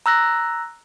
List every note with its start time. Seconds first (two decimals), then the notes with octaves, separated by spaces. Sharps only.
0.06 A#5 E6 F#6 A#6